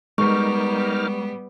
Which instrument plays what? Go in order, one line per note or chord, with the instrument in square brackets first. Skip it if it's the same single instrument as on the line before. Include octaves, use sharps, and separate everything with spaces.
[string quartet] G3 B3 [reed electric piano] G#3 [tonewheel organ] D#4 A#4 F6 [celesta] C#6